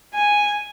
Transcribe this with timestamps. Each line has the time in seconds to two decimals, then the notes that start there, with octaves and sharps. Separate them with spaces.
0.14 G#5